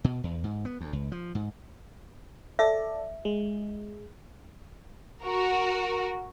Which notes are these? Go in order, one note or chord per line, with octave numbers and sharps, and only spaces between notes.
B2
E2
G#2
B3
D2
C#2
F3
G#2
A4 D5 E5
G#3
F#4 A#4